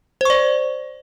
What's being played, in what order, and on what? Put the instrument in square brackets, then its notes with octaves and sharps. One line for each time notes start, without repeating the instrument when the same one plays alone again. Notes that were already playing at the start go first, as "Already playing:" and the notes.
[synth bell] C5
C#6
D5